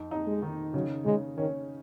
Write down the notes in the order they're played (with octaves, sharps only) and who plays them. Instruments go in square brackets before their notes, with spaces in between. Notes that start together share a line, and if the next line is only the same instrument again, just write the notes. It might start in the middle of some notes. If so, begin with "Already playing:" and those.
Already playing: [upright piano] F2 D#4
D#4
[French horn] G#3
[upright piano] D#3
[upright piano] C#3 [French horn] F#3
[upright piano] C#3 [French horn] G#3
[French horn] D#3 [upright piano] C#4